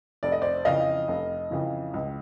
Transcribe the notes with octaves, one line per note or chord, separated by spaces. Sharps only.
F1 D5
D#5
C5 D5
F2 C#3 E3 D#5 F5
F1
F2 C#3 E3
C#2